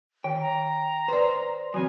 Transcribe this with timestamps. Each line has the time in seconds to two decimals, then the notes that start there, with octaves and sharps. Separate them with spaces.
0.24 D#3 G5
0.41 A#5
1.08 B4 C5 D5
1.74 C#3 E3 F#3 C4 G#5